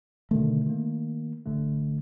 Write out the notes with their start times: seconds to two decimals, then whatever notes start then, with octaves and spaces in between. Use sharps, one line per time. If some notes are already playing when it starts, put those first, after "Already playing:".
0.31 B2 D3 D#3 A3
0.67 D#3 A#3
1.46 A1 D3 A3